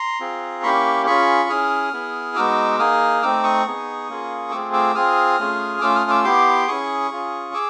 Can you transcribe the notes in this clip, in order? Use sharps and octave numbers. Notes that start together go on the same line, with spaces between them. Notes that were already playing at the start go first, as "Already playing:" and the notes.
Already playing: A#5 C6
C4 F4 G#4
A#3 C#4 E4 G4 B5 C#6
C#4 F4 G#4 B5 C#6
C#4 E4 G#4 D#6 F6
B3 E4 G#4
G#3 B3 D#4 F#4 D6 E6
A#3 D#4 G#4 D#6 F6
A3 C4 D#4 D6 E6
C#6 D#6
B3 D#4 G#4
A#3 C#4 F4 G#4
A3 C4 F4 G#4 D6 E6
D6 E6
C4 F4 G#4 D#6 F6
A3 C#4 F4 G#4
A3 C#4 F4 D6 E6
D#6 F6
D6 E6
B3 E4 G4 C6 D6
C#4 E4 G#4 C#6 D#6
C#4 F4 G#4
G#4 D6 E6